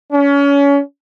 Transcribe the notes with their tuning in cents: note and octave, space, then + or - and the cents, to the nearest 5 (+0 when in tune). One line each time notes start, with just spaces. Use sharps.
C#4 +30